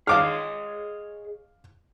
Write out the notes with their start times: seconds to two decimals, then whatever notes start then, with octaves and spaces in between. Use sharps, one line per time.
0.07 G#4 C#5 D#5 F5 D6 F6